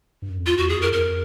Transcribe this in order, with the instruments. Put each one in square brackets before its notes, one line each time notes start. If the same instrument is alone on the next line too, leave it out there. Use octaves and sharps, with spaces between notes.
[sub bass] G2
F#2
F2
[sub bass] E2 [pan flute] F4
[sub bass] E2 [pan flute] F#4
[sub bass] F2 [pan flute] G#4
[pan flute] A#4
[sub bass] F#2
[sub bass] F2 [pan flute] A#4